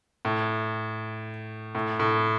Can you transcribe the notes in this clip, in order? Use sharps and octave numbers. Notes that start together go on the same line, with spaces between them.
A2
A2
A2